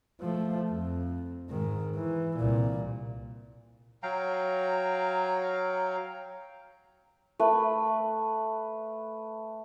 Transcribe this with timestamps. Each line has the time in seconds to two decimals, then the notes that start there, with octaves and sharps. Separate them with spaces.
0.21 F3 A3
0.70 F2
1.50 G#2 D#3
1.95 E3
2.38 C2 A#2
4.03 F#3 F5 G5 A#5
7.39 A3 B4